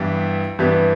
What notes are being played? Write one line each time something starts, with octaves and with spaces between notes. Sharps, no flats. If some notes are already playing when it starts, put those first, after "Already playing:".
Already playing: G2 E3 G3 B3
G2 E3 G3 B3